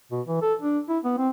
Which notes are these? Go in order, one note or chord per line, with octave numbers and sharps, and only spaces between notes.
B2
E3
A4
D4
E4
B3
C4